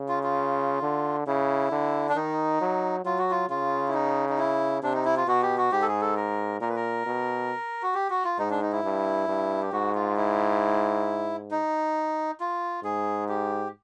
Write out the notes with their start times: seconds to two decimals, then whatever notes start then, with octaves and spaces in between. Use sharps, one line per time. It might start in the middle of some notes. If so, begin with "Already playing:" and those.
Already playing: C#3
0.09 F4
0.23 F4
0.83 D3
1.27 C#3 E4
1.72 D3
2.09 D4
2.16 D#3 D#4
2.61 F#3
3.05 F#3 F4
3.18 F#4
3.31 F4
3.49 C#3 F4
3.88 E4
3.94 D#4
4.29 D#4
4.38 E4
4.83 C3 D4
4.94 D#4
5.05 E4
5.17 F4
5.27 B2 F#4
5.42 G4
5.58 F#4
5.72 G#2 G4
5.82 A4
5.88 G#4
6.01 A4
6.17 A#4
6.61 A#2 A#4
6.68 B4
6.76 A#4
7.06 B2
7.83 F#4
7.94 G4
8.10 F#4
8.25 F4
8.39 G#2 D#4
8.50 D4
8.62 D#4
8.72 E4
8.84 G2
9.28 G2
9.63 G4
9.72 G#2 F#4
9.95 F4
10.16 E4
11.51 D#4
12.40 F4
12.84 G#2 G#4
13.28 G4